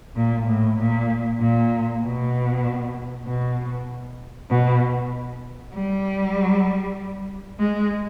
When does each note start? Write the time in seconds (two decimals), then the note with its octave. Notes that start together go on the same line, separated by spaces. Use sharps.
0.16 A#2
0.46 A2
0.78 A#2
1.39 A#2
2.02 B2
3.25 B2
4.50 B2
5.73 G3
7.59 G#3